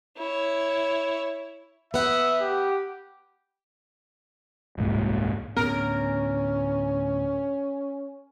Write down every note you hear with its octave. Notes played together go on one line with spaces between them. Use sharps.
E4 C#5
B3 E5 F#5
G4
D#1 C2 G#2 A#3
D2 A2 B3 C#4 A#4